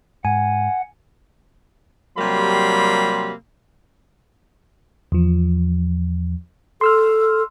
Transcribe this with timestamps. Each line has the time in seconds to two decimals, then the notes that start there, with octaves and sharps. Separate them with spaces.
0.25 G#2 F#5 G#5
2.18 C3 F#3 G3 A#3 B5 C6
5.12 E2 F3
6.81 A4 C6 E6 F6